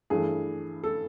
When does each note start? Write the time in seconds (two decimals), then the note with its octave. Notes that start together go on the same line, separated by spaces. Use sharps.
0.10 G2 E3 A3 G#4
0.84 A4